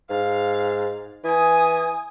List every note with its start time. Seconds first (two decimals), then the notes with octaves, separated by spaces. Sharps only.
0.10 G#2 F5
1.24 E3 G#5 D#6